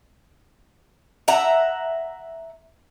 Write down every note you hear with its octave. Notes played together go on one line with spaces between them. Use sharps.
E5 F#5 A#5